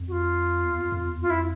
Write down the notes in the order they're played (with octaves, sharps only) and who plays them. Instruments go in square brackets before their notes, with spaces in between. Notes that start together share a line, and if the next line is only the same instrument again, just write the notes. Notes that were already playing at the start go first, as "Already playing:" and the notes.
Already playing: [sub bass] F2
[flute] F#4
F4
[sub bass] E2
F2
F2
E2
[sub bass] F2 [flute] F4
[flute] E4